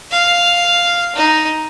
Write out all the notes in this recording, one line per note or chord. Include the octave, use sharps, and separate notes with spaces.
F5
D#4